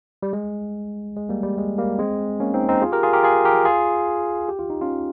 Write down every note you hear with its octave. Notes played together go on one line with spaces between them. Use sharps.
G3
G#3
G#3
G3 A#3
G3
G#3
G3 A#3
G#3 C4
A#3 C#4
C4 D#4
C4 D#4
F4 G#4
G4 A#4
F4 G#4
G4 A#4
F4 G#4
G4 A#4
F4 G#4
G4
F4
D#4
C#4 F4